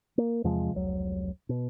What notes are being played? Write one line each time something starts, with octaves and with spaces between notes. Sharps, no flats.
A#3
E2 C3 F3 G#3
F1 C#2 F#3
B2